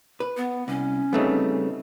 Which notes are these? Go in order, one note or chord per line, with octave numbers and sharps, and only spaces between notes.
B4
B3
C2 C#4
C#3 G3 A3 B3 C4 D#4